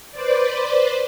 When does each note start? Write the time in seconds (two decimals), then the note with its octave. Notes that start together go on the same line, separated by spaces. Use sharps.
0.12 B4 C5 D5